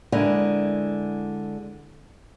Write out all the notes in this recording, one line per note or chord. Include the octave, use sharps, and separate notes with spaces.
D3 G#3 E4 A#4 B4